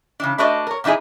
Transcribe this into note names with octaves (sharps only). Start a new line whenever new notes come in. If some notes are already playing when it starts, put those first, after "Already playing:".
C#3 E3 D4
A3 D4 F#4 B4 D5 D#5
A#4 C#5
A#2 E3 D#4 E4 G#4